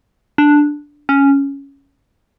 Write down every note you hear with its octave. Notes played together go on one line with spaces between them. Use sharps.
D4
C#4